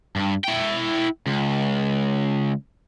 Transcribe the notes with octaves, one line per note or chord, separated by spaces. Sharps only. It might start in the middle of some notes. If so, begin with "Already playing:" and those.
G2
E4 G5
C#2